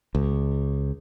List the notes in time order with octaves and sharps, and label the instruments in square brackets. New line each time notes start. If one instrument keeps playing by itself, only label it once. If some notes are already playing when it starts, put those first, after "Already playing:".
[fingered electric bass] C#2